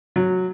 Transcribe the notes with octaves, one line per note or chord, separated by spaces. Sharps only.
F#3